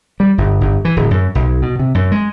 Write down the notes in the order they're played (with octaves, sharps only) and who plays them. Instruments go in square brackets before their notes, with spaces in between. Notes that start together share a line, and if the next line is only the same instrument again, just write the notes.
[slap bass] G3
G1
G1
E3
D1
F#2
B1
B2
C3
F#2
G#3